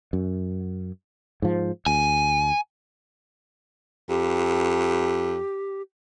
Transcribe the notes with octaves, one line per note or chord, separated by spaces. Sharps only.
F#2
G#2 F3
D2 G#5
F2 G4